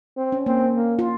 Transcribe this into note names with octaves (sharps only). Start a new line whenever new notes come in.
C4
C#4
A#3 C4
A#3
F4